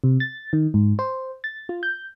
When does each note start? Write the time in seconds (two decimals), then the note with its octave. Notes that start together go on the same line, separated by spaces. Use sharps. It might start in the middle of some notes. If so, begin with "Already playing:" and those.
0.04 C3
0.20 A6
0.53 D#3
0.74 G#2
0.99 C5
1.44 A6
1.69 F4
1.83 G6